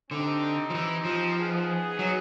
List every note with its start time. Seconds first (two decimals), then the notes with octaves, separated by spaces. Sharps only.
0.10 D3 C4 D#4 G4
0.70 F3
0.74 E3
1.05 F3
1.37 B3 D#4 G#4
1.99 F#3